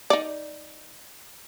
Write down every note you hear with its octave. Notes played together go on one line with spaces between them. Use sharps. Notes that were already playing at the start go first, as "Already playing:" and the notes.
D#4 D5